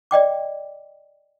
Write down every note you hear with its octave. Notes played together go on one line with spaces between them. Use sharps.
D5 D#5 G5 D6